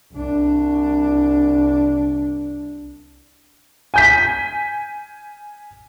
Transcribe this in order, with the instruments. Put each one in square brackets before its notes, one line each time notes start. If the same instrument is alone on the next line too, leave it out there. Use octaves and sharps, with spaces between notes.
[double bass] C2 D4
[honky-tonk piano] G#5 G6 B6